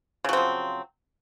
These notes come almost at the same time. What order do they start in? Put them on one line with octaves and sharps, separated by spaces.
C#3 F#3 C4 F3